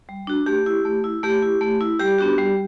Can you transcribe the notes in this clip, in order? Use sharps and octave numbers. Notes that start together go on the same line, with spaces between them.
G3
D4 F#4
A3 G4
E4
A3
E4
A3 G4
E4
A3
E4
G3 G4
B3 D4 F#4
G3